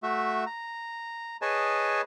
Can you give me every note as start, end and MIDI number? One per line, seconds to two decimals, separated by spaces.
0.03 0.44 57
0.03 0.44 66
0.03 0.44 76
0.46 1.37 82
1.42 2.01 68
1.42 2.01 71
1.42 2.01 73
1.42 2.01 75
1.42 2.01 80
1.42 2.01 81